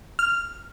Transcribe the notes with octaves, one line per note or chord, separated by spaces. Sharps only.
F6